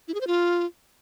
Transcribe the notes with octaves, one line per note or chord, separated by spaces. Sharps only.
E4
G#4
C5
F4